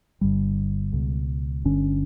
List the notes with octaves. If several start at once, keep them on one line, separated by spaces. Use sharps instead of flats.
G1 G2 D3 G3
C#2 B2
G1 G2 D3 C#4